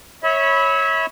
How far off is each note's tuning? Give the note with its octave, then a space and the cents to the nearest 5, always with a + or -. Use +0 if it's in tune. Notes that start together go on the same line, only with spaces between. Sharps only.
C#5 -10 E5 -30 B5 +0